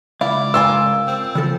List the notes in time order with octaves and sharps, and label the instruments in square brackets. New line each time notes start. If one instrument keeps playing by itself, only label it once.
[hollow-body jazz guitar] C#2 F5 [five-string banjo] E4 [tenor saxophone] D5
[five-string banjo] A#3 F4 G#5 [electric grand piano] E6
[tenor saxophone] C4
[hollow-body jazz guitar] C#3 F3 A4